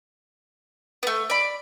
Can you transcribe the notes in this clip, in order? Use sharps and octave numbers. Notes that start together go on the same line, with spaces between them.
A3 B3
D5 B5